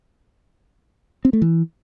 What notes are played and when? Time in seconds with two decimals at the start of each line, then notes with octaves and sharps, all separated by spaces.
1.25 C4
1.33 A3
1.42 E3